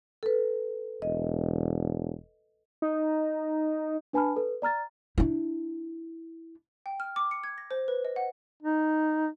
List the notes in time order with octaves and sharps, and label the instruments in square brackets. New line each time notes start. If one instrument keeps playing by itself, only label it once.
[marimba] A4 B4
[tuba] E1 [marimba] D#5
[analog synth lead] D#4
[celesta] D4 B4 G#5 A5 B5 F6
A4 B4
D5 A#5 F6 A6
[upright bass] D4 E4
[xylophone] G5
F6
D6
C#7
G#6
A#6
C5
B4
D#5
F#5
[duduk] D#4